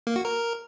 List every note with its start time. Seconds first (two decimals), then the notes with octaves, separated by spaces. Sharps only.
0.07 A#3
0.16 F#4
0.25 A#4